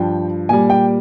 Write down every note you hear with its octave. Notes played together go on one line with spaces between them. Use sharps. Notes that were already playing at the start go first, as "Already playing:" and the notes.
Already playing: G2 F3 G5
A#2 G3 G#5
G5